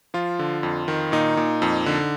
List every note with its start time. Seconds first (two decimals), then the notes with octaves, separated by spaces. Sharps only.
0.14 F3 F4
0.39 D3
0.63 F2
0.88 D#3
1.12 A#2 D#4
1.37 A#2
1.62 F2
1.86 D3